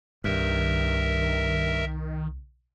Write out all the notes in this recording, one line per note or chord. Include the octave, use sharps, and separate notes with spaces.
C2 G2 D#3 A#4 E5